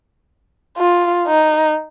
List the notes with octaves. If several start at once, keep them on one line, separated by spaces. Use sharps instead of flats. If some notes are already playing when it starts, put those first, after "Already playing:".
F4
D#4